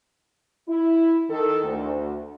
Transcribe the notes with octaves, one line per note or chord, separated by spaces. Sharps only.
E4
D#3 A4
D2